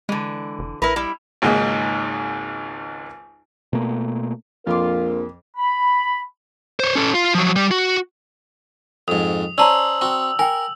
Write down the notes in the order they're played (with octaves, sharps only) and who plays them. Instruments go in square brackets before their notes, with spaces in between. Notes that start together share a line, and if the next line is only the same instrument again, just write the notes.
[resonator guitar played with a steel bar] D3 E3 [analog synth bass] G#3
[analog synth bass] F1
[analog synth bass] A#1 [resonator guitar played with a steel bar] E4 A#4 B4
[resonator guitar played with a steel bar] G3 E4
[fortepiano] G#1 C#2 G#2 A#3 D#4
[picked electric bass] B2 A3 A#3
[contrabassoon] A#1 [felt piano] F2 D6 [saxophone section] F4 [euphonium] A#4
[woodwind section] B5
[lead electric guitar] C5 C#5
C#4 A4
F4
F3 F#3
G3
F#4
[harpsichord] F2 G#2 [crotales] D#6
[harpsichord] C#4 C5 [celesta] D5 A5 A#5 [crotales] E6 F#7
[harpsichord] C4 F#4
[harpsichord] A#4 [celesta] G5 G#5